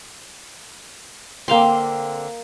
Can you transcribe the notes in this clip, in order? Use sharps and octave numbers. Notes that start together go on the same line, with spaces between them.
D3 A#3 C4 F5 C6